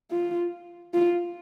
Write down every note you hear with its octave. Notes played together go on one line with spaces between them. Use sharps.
F4
F4